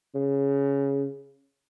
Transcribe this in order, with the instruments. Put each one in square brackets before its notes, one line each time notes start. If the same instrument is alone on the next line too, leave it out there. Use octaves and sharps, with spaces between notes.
[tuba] C#3